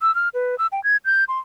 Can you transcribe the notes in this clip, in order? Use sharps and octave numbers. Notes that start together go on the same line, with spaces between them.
E6
F6
B4
E6
G5
G#6
G6
C6